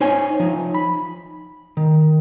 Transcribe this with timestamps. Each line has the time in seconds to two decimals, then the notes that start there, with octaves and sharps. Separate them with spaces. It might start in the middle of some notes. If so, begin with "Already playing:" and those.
0.01 D#4 C5 C#5 G#5
0.40 F3 D#4
0.74 B5
1.77 D#3